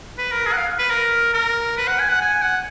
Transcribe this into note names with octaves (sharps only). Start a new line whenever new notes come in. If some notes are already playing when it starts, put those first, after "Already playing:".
B4
A#4
G#4
F#5
F5
B4
A#4
A#4
B4
F#5
G#5
F#5
G#5
F#5